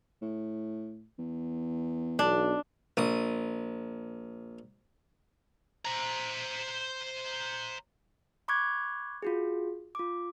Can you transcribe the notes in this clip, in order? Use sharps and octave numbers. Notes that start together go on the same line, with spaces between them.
A2
E2
B1 D4
A#1 D#6
C5 A#5
B5 C#6 D6 F#6 G#6
F4 F#4 G#4
F4 D6